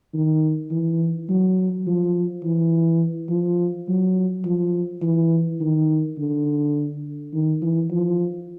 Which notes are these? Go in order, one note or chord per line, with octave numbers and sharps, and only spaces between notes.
D#3
E3
F#3
F3
E3
F3
F#3
F3
E3
D#3
D3
D#3
E3
F3